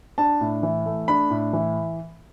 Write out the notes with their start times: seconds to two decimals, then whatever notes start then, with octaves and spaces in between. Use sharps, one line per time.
0.18 D4 A5
0.41 A2
0.63 E3
0.86 A3
1.08 D4 B5
1.30 A2
1.53 E3